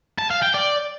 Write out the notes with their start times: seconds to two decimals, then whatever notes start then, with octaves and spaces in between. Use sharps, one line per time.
0.18 A5
0.30 F5
0.42 G5
0.54 D5